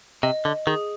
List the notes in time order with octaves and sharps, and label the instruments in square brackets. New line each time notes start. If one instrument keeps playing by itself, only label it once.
[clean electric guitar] C3 [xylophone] D#5
[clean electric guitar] D3 [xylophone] D#5
[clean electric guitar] D#3 [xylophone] G#4